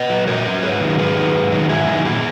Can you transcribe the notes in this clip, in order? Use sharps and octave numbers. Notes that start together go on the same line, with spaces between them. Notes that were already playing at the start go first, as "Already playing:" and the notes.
Already playing: B4 D#5
F#3
A#2 A#4 C#5
F#3
G#2 G#4 B4
D#3 F#3
G#2 G#4 B4
D#3 F#3
G#2
D#3 F#3
G#2 E4 G#4
D#3 F#3
A#2 E4 G#4